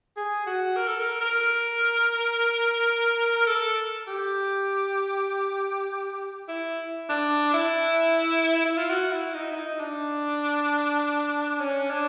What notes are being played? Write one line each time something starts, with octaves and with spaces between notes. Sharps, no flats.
G#4
F#4
A#4
A4
A#4
A#4
A4
G4
E4
D4
E4
E4
F4
F#4
E4
D#4
E4
D#4
D4
C#4
D4